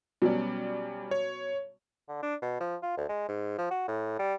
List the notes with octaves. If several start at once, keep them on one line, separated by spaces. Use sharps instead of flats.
B2 F#3 G3 C#4 D5
C#5
D3
D4
B2
F3
F4
D2
G#3
G#2
F3
F#4
A2
G3